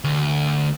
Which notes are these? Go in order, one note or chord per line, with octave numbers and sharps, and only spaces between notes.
D2